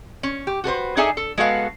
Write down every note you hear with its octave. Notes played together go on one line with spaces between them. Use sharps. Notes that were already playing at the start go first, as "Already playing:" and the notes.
C#4
G4
F#4 A4 B4 C5
D4 D#4 G#4 A4 E5 G#5
A4
G#3 B3 F#4 A4 B4 F5